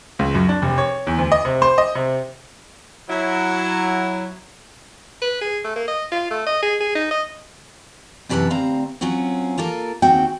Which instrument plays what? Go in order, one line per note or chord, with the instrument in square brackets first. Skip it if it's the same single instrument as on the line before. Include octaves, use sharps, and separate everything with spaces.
[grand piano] C#2
F#2
D4
F1
C#5
E2
D2
D#5
C3
C5
D#5
C3
[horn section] F#3 E4
[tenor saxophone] B4
G#4
A3
A#3
D#5
F4
A3
D#5
G#4
G#4
D#4
D#5
[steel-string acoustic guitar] F#2 C3 E3 F#4 B4 A5
D2 C4 F5 A#5
F#3 C4 C#4 F4 F#4
A#3 F4 A4 A#4
D#2 C#3 C4 F#4 G5